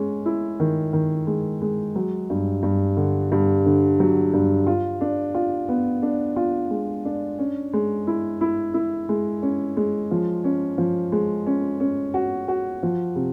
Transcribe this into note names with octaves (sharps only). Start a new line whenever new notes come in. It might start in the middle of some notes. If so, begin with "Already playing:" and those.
Already playing: G#3 C#4
E4
D#3
D#3
G#3
G#3
F#3
G2
G2
D3
G2
D3
F#3
G2
F4
D4
F4
B3
D4
F4
G#3
D4
C#4
G#3
E4
E4
E4
G#3
C#4
G#3
F3
C#4
F3
G#3
C#4
C#4
F#4
F#4
F3
C3